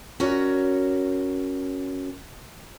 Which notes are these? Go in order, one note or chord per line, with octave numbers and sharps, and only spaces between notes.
C#4 F#4 A#4 C#5 D5